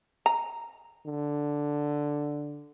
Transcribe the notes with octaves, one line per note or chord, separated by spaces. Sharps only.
A#5
D3